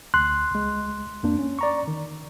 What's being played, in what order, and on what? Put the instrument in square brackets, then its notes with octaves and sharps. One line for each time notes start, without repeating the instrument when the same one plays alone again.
[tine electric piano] D2 [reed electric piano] C6 F#6
[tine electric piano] C#2 G#3
F2 A#3 D4
C#4
D5 A#5 C#6
D#3